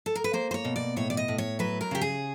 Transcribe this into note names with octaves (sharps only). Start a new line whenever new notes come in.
A4
A#4
B4
A#3 C5
C5
C#5
B2
D5
A2 C#5
D5
D#5
A2
C#5
F#3 B4
A#4
C#3 G4
G#4